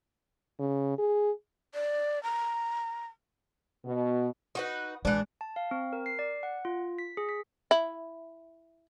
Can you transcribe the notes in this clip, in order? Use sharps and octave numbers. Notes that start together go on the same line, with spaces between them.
C#3
G#4
D5
A#5
B2
D#4 F#4 B4
A#1 E3 G#3 D4
A5
F5
C4
A#4
C7
D5
F#5
F4
B6
G#4
B6
E4